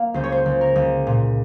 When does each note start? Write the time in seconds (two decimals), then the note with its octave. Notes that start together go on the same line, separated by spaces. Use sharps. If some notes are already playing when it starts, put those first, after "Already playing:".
Already playing: A#3 F5
0.14 C#2 C5
0.24 C#5
0.32 C5
0.46 C#2
0.61 A#4
0.76 C#2
1.07 A#2